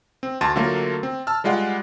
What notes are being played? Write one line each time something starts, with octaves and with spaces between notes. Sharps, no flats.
C4
D2 A5 C6 A6
D3 F#3 A3 A#3 F4 A#4
C4
A5 E6 F6
G3 G#3 F4 D5 F#5